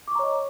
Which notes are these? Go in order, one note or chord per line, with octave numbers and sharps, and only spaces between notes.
C#5 D#5 A#5 C#6 D6